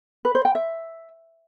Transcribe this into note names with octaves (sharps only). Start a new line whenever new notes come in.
B4
C5
G5
E5